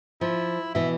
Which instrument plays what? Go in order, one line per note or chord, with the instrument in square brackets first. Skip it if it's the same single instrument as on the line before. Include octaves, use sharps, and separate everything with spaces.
[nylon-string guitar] F3 [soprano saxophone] E4
[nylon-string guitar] B2 E3 [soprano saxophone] E5